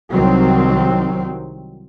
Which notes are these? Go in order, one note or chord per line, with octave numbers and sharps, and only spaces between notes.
C2 D#3 F#3 C4